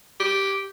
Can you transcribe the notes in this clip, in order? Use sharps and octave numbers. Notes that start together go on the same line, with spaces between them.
G4